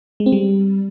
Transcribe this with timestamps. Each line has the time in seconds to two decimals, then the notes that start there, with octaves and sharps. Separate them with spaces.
0.20 G#3
0.26 C4
0.32 G3